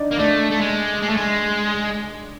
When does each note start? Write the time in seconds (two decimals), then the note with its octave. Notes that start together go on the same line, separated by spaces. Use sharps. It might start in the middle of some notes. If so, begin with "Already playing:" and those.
Already playing: D4 D#4 D5 D#5
0.12 A#3
0.19 A3 D4 D5
0.52 A3
0.61 G#3
1.02 G#3
1.10 A3
1.17 G#3